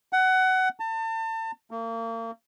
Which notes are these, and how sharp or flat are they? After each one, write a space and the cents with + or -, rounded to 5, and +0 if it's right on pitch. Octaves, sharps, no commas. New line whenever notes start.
F#5 +20
A5 +35
A#3 -35